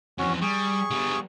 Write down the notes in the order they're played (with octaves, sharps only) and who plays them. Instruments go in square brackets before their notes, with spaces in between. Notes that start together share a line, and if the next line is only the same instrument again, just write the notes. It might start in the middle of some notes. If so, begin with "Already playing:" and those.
[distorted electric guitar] F2 E3 [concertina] C#4 F#4
[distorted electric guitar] G3 [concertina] G#4 C#6
[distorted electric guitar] G3 B3